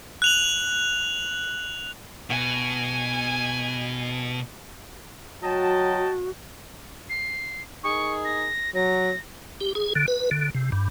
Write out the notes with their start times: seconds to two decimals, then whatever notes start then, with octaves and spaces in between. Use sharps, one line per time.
0.22 F#6 F7 F#7
2.30 B2 G#5
5.43 F#3 F#4 D#5 G5 A5
7.10 C7
7.84 D#4 G#4 A#4 C#6
8.25 A#6
8.75 F#3 A#6
9.61 G4
9.75 G#4
9.95 D3
10.08 B4
10.31 D3
10.55 C3
10.72 G2